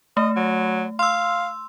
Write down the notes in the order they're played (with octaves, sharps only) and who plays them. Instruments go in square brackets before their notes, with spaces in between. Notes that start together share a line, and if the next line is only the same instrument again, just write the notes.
[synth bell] A3 [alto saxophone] D#5
[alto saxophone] F#3
[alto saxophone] F5 [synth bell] C6 E6